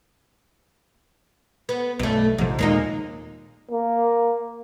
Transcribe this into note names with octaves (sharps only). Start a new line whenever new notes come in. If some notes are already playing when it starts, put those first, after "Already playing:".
B3
B1 G2 A3
A#1 G#2 C3 F3
D#2 A#2 G#3 A#3 D#4
A#3